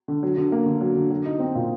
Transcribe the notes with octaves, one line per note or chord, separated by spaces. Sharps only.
D3
F#3
D3
A#3
D3
F#3
D3
F#3
D#4
C4
A#2